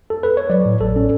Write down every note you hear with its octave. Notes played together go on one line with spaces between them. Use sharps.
A4
B4
C#5
F#3 D5
A2
A1 A4
C#4